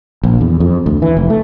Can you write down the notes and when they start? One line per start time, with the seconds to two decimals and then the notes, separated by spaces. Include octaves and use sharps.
0.23 A#1
0.41 E2
0.60 F2
0.86 D2
1.02 E3
1.17 F1
1.30 A3